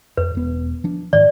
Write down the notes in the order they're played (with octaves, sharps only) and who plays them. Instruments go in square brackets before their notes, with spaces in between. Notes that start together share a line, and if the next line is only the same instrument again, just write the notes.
[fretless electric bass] F2 [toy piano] B4
[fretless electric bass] E1 B3
F3 D4
[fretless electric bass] G#2 D#3 [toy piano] D5